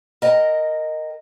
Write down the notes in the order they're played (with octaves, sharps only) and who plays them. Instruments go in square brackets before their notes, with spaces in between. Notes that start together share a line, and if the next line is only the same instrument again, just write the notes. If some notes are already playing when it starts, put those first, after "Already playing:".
[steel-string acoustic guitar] A#4 D#5 G5